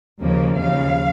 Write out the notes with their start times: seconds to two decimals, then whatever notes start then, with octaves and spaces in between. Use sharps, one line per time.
0.21 D#2 C#3 F3 A#3
0.58 D#2 C#3 F3 F5